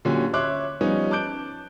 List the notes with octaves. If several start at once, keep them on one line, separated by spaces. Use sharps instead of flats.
A#2 D3 F#3 C#4 G4
C#5 E5 C6 D6 F#6
F3 G3 B3 C#4 D#4
A5 D6 F#6 G6 D7